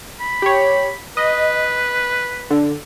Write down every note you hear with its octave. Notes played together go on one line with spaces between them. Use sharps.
B5
G4 C#5
B4 D#5
D3